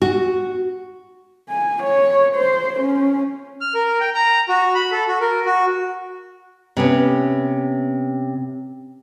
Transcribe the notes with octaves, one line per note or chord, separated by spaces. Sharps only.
F#4
G#5
C#5
C5
C#4
F6
A#4
G5
A#5
F#4
B5
A4
F#4
A#4
F#4
C3 B3 C#4